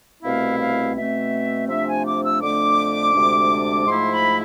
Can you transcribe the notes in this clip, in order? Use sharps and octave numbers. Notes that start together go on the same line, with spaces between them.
C2 B2 A3 C4 E4 F5
F5
B2 A3 C4 E5
C3 F3 A3 D4 E5
G#5
D6
E6
F2 D3 A3 D4 D6
D2 C3 G#3 D4
G#2 F3 A3 E4 C6
B5